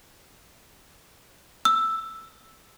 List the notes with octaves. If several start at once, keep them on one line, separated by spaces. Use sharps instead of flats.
E6